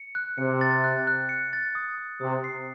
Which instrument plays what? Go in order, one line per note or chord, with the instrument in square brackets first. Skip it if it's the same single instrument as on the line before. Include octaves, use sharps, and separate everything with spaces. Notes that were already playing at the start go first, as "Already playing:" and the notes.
Already playing: [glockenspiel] C#7
F#6
[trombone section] C3 [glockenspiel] C#7
[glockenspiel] A6
F#6
F#6
C#7
A6
D#6
D#6
[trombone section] C3 [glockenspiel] D#6
[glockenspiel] C7